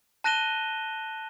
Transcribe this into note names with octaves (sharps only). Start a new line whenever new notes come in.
A5 F#6 A#6 D#7 E7 G7